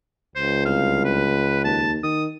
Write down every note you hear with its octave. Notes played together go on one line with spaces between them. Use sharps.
C#2 C5
C2 F5
B4
D#2 A5
D#3 D#6